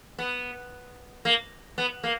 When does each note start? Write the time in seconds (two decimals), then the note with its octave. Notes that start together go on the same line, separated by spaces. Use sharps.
0.19 B3
1.25 A#3
1.78 B3
2.03 A#3